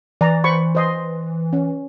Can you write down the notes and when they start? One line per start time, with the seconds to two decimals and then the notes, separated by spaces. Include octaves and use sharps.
0.21 E3 D5 A#5
0.44 C5 B5 C#6
0.75 C5 D#5 C6
1.53 C#4